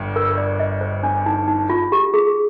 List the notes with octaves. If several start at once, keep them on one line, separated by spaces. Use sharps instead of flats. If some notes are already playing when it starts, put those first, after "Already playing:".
Already playing: G1 G2
A#4
D5
D#5
C5
D4
D#4
D#4
F4
G4
G#4